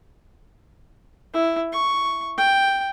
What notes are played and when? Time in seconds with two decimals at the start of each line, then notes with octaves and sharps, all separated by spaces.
1.33 E4
1.72 C#6
2.38 G5